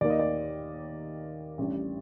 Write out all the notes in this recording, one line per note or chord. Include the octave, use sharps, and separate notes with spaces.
D#2 D#3 A#3 D5
D#5
D5
A1 A2 G3 D4